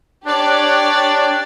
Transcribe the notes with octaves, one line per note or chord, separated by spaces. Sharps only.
D4 G4 C#5 D5